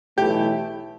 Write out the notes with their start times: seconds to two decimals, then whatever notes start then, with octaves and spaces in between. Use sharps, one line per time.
0.17 B1 A2 E3 A3 E4 G4